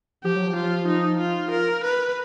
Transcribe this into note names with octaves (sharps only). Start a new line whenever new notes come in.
F3 G4
F#3
F3
F4
D#4
F4
A#4
B4